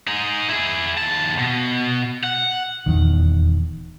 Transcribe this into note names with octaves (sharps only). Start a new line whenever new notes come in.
D#4 G#4
E4 G#4
D#2 A5
B2
F#5
D#1 E2 D#3